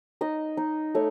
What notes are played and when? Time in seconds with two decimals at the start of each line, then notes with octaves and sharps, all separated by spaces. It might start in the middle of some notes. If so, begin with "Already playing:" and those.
0.21 D#4 D#5
0.57 D#4
0.95 A3 C#5